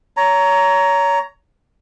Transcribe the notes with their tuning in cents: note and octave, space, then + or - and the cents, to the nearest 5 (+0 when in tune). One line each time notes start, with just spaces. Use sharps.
C#5 +25 A#5 +0